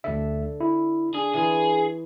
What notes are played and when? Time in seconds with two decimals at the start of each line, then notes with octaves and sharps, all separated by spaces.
0.04 D2 D3 A4 E5
0.60 E4
1.14 D4 G#4
1.34 E3 G#4 C6